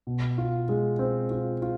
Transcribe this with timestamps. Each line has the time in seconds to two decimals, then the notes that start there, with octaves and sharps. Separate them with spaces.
0.07 B2
0.38 F4
0.69 G#3
0.99 C4
1.31 F4
1.62 F4